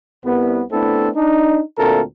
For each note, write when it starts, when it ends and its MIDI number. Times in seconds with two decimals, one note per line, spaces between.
0.24 0.62 36
0.24 0.62 59
0.72 1.09 57
0.72 1.09 59
0.72 1.09 60
0.72 1.09 62
0.72 1.09 64
0.72 1.09 69
1.15 1.60 62
1.15 1.60 63
1.78 2.01 38
1.78 2.01 46
1.78 2.01 57
1.78 2.01 60
1.78 2.01 69
1.78 2.01 70